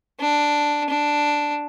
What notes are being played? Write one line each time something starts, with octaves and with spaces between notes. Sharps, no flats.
D4
D4